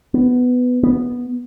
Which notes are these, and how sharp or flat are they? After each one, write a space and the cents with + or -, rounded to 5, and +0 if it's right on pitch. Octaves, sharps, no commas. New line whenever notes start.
B3 +10
B3 -10